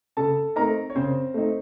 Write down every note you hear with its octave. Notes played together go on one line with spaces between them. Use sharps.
C#3 A4 A5
A3 C4 D#4 A#4 A#5
C#5
C#3 C4 C5
A3 C4 D#4